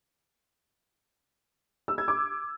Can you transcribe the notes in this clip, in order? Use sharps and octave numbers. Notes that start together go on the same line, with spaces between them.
E6
G#6
D6